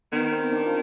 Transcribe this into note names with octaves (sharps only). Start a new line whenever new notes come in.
D#3 B3
C4
D4
F4